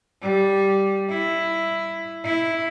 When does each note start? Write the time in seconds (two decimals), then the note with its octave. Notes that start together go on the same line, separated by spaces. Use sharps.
0.21 G3
1.09 E4
2.24 E4